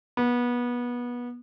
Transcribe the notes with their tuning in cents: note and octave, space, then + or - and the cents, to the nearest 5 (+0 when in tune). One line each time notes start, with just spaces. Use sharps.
B3 -25